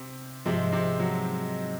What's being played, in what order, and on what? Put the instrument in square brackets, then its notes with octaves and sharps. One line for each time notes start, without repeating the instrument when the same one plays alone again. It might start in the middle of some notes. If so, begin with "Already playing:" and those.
Already playing: [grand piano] C3 C4
[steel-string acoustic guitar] G#2 F3 G#3 [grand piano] C3 C4
[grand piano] C3 C4
F#3